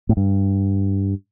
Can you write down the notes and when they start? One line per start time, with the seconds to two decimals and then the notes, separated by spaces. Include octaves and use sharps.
0.09 A2
0.17 G2